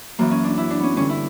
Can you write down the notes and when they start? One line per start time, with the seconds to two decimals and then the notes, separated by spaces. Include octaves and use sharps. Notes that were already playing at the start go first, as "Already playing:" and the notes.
0.19 F#2 E3 A#3
0.31 C#4
0.44 D4
0.58 E4
0.70 D4
0.80 B3 C#4
0.96 G2 D3 C#4
1.09 E4